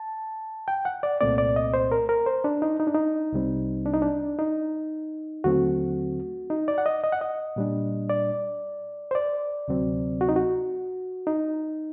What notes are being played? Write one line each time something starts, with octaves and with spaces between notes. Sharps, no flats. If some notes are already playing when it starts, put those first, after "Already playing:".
Already playing: A5
G5
F#5
D5
C2 A#2 A3 C4 D5
D5
D#5
C5
A#4
A#4
C5
D4
D#4
D#4
D4
D#4
C2 C3 G3 C4
D4
D#4
D4
D#4
D#2 D3 F#3 A3 C4 F#4
D#4
D5
F#5
D#5
D#5
F#5
D#5
A#2 G3 D4
D5
C5
D5
D2 C3 F#3 C4
F#4
D#4
F#4
D#4